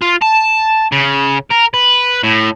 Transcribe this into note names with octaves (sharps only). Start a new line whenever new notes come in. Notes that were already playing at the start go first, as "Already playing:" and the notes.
F4
A5
C#3
A#4
B4
A2